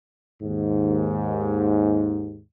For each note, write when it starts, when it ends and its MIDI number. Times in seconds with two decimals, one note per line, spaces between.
0.42 2.40 39
0.42 2.40 44